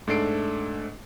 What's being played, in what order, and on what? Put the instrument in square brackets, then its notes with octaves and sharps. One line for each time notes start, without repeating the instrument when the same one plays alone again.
[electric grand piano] G#2 A3 D4 A4 C7 D7